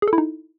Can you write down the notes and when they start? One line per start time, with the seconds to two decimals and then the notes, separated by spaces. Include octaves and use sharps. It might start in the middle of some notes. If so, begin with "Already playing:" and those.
0.02 G#4
0.08 A4
0.13 E4
0.18 D#4